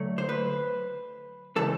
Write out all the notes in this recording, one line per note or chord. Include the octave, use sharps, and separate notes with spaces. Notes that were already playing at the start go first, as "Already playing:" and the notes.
Already playing: D3 F#3 A3
C5
B4
C#3 E3 G#3 A4